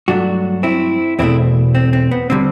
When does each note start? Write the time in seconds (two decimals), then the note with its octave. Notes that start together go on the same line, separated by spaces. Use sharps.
0.08 G2 F#3 A3 D4 F#4
0.63 C4 E4
1.19 E2 B2 A3 C4 E4
1.75 C4
1.93 C4
2.11 B3
2.30 D3 G3 C4